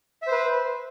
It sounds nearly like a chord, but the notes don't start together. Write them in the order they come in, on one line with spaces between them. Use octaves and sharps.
E5 C5 B4